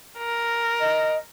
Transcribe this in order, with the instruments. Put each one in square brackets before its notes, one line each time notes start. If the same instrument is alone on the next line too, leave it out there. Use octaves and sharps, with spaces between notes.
[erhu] A#4
[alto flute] D#5